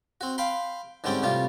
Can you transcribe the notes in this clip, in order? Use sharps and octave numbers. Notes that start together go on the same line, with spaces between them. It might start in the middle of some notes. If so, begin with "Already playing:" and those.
C4 F#4
F5 G5 B5 C6
G#2 D3 G3 C4 C#4 G5
A2 C3 G3 F4